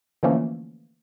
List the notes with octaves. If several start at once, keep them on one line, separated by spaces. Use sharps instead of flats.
D3 E3 F3 A3 A#3 C#4